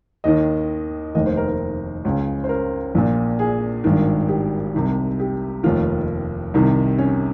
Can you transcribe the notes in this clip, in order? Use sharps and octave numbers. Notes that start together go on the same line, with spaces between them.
D#2 D#3 D#5
F1 D#2 D#3 D#5
C5
A#4
A#4
C#2 C#3
C5
A#4
A#1 A#2
G#4
G#1 G2 D#3
G4
C2 C3 D#3
G4
F1 D#2 D#3 F4
C2 C3 D#3
C#4